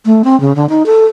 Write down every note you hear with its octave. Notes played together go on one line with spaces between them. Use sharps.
A3
C4
C#3
D3
D#4
A4